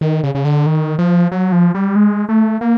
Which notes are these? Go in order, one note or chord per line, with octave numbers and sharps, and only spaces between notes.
D#3
C#3
C#3
D3
D#3
F3
F#3
F3
G3
G#3
A3
A#3